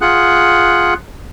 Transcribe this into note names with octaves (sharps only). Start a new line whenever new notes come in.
F4 G#4 F#5 F#6